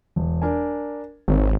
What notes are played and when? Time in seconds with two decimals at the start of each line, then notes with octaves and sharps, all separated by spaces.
0.16 E1
0.42 D4 A#4 G#5
1.28 G#1 D#3 C4 C#5